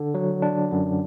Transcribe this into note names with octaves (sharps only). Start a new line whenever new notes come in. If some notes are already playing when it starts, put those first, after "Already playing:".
Already playing: D3
F#3
D4
F#2